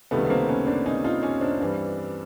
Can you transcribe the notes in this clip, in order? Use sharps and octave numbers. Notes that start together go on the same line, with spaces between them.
C#2 C3 D#3 G3 A3 B3
B3
A#3 C4
B3 C#4
C4 D4
C#4 D#4
D#4 F4
C#4 D#4
C4 D4
G2 E3 G3